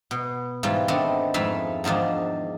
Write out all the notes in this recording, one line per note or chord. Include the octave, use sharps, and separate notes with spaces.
B2
G#2 E3 G3 F4 G5
D#3 A3 B3 C4 D4
F2 G#2 A3 E5 F5 B5
E2 G#2 D#3 F3 D4